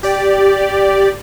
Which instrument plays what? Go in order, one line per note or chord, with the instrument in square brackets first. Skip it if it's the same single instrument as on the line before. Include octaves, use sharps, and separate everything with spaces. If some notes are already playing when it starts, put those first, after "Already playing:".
[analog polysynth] G4 D5